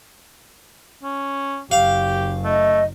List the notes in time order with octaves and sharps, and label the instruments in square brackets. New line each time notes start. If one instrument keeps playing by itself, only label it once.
[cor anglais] C#4
[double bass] F#1 [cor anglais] G4 [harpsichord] F5
[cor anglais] A3 [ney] D#5